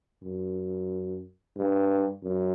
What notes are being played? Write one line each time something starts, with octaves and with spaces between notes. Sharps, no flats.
F#2
G2
F#2